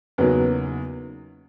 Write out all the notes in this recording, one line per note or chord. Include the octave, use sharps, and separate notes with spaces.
E2 C#3 F#3 A#3 D#4 B4